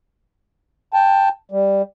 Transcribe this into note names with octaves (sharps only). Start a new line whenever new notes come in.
G5 A5
G3